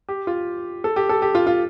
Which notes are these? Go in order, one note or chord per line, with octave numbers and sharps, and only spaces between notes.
G4
F4
A4
G4
A4
G4
F4
F4